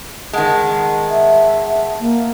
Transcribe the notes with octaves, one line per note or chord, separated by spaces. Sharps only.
D#3 G#3 F#5 A5
E5
A#3